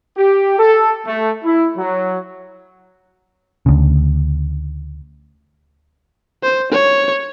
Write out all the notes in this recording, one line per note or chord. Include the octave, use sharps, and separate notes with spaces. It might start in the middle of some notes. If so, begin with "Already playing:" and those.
G4
A4
A3
E4
F#3
D2 C#3
C5
C#5